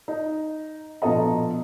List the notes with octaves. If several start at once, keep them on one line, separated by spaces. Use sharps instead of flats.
D#4
A#1 B2 F3 A4 D#5 A#5